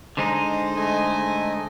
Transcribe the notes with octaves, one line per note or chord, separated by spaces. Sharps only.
D3 G#3 D#4 C5
A3 D#5 G#5